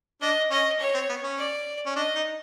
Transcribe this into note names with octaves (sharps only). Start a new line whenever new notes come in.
D4 D#5
C#4 D#5
C#5
C4
B3
C#4
D5
C#4
D4 D#5
D#4